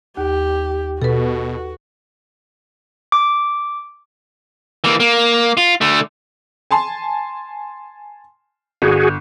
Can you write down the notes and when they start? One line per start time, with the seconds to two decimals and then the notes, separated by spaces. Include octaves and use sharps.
0.17 D#2 G4
1.02 B2 F#4 A4 B4
3.12 D6
4.84 E3 A#3
5.00 A#3
5.57 F4
5.81 D3 A3
6.71 G#5 A5 C6
8.82 G1 F#4 G#4